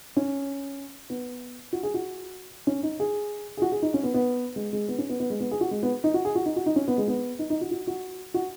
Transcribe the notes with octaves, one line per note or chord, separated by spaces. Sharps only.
C#4
B3
F#4
G#4
F#4
C#4
D#4
G#4
G#4
F#4
G#4
D#4
C#4
B3
B3
G#3
G#3
B3
C#4
B3
B3
G#3
B3
G#4
F#4
G#3
B3
D#4
F#4
G#4
F#4
D#4
F#4
D#4
C#4
B3
G#3
B3
D#4
D#4
F#4
F#4
F#4
F#4